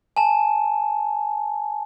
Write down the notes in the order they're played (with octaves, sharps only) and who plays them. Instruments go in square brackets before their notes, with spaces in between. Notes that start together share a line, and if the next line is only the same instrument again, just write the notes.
[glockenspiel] G#5 A5